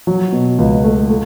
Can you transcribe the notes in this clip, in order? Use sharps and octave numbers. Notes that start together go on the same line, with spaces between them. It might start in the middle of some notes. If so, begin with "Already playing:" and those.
F#3
B2
C#2
A3
A3